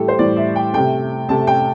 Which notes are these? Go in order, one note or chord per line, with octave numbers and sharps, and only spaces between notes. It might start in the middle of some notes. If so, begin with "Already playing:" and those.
Already playing: A2 E3 G3 G4 A4
C5
A2 E3 G3 D5
E5
G5
C3 A3 G5
C3 A3 A5
G5